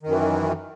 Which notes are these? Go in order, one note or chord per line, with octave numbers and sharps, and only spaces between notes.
F#2 D#3 E3